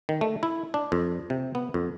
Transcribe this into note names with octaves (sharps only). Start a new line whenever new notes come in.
D#3
A3
E4
D4
F2
C3
B3
F2